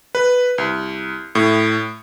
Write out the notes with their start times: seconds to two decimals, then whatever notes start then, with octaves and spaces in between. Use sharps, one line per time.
0.15 B4
0.58 C2
1.35 A2